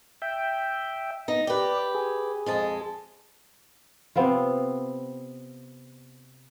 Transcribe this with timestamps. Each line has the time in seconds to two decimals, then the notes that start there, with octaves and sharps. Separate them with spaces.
0.22 E5 G5
1.28 B3 D#4 A#6
1.47 G4 B4 D5
1.95 G#4
2.46 F2 G#3 A5
4.16 C3 B3 C4 F4